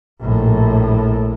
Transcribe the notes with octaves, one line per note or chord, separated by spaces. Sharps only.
A#1 A2